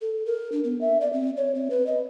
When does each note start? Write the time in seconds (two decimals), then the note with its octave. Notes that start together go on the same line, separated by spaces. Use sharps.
0.01 A4
0.26 A#4
0.52 D4
0.64 B3
0.81 E5
1.01 D5
1.13 C4
1.37 C#5
1.55 C4
1.70 B4
1.87 D#5